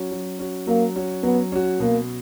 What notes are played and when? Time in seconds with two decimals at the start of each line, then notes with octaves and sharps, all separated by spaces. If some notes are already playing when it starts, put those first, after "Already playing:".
Already playing: F#3 C#4 F#4
0.12 F#3
0.39 C#4 F#4
0.67 F#3 A#3
0.96 C#4 F#4
1.23 F#3 B3
1.52 C#4 F#4
1.80 B2 A#3